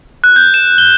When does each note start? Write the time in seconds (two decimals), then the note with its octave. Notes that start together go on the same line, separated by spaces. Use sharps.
0.24 F#6
0.36 G6
0.54 E7
0.78 G7